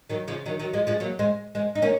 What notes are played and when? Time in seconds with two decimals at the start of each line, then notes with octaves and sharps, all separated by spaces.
0.10 D#3 F#3
0.28 C#3 F3
0.46 D#3 F#3
0.59 D#3 F#3
0.73 F3 G#3
0.87 F3 G#3
1.00 F#3 A#3
1.19 G#3 C4
1.55 G#3 C4
1.75 D#4
1.82 A#3 C#4